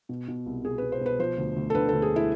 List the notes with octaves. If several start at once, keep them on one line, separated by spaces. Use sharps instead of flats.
B2
B2
C2
B2 G#4
B2 B4
C5
B2 B4
F3 C5
D2
D2
A4
D3 B4
D2 A4
G#4
E4